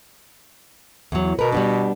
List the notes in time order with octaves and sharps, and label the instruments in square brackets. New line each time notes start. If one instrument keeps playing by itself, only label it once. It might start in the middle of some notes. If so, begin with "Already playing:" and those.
[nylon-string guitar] E2 F#3
[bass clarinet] B2 [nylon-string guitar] A#4 B4
[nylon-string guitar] G3 B3 D4